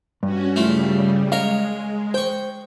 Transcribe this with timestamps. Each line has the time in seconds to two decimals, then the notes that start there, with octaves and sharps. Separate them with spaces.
0.23 G2 C#4 F#4
0.56 C#3 G3 A3 E4 F4
1.32 G#3 A#4 C#5 D#5 F5
2.14 C5 G5 C#6